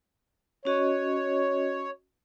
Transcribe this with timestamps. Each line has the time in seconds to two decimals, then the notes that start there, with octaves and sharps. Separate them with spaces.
0.65 C#4 F#4 C#5 D#5